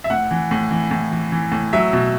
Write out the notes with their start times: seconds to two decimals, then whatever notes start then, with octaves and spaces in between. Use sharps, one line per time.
0.04 E5
0.10 A2 F#5
0.31 E3
0.51 A2
0.71 E3
0.91 A2
1.12 E3
1.32 E3
1.52 A2
1.73 F#3 E5
1.93 B2